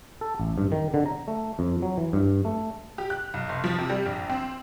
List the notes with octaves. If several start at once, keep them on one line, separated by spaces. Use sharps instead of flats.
A4
A1
G2
D#3
D3
A#5
A3
F2
F#3
E3
G2
A3
G4
F#6
B1
F1
F3
C3
G3
A#1
C4